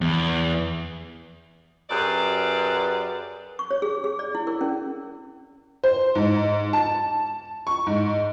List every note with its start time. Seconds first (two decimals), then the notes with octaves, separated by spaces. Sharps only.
0.01 E2
1.90 F#2 G4 G#4 B4 D5
3.59 C#6
3.71 C#5
3.82 G#4
4.04 G#4
4.19 D5
4.35 E4
4.47 A#4
4.61 C#4
5.84 C5
6.15 G#2
6.73 A5
7.67 C#6
7.86 G#2